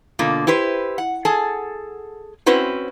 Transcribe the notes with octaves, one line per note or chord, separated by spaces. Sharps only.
B2 D3 A#3 F4
E4 G4 B4 C5
F#5
G#4 A4 G#5 A5
C4 C#4 E4 F#4 B4 C5